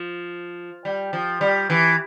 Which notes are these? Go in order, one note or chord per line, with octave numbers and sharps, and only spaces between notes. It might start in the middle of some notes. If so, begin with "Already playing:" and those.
Already playing: F3
G3
F3
G3
E3